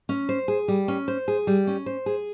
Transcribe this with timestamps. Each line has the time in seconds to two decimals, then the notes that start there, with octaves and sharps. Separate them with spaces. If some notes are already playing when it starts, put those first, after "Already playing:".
0.09 C#4
0.29 C5
0.48 G#4
0.68 G3
0.88 C#4
1.08 C5
1.28 G#4
1.47 G3
1.67 C#4
1.86 C5
2.06 G#4